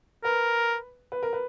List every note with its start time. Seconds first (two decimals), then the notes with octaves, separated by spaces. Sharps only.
0.24 A#4 B4
1.12 B4
1.23 A#4
1.33 B4